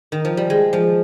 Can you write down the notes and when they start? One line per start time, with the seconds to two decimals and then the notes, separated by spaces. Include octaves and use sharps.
0.12 D#3
0.25 F3
0.37 G3
0.50 G#3
0.73 F3